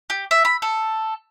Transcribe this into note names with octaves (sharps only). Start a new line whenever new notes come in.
G4
E5
B5
A4